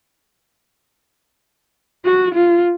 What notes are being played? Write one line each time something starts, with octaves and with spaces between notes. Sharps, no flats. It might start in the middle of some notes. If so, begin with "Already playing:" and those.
F#4
F4